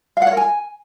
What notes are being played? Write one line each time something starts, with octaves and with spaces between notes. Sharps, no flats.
F5
F#5
C#5
A#4
G#5